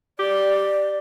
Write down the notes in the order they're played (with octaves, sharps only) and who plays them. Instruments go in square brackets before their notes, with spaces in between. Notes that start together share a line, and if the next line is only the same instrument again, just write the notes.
[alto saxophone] G4 [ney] D5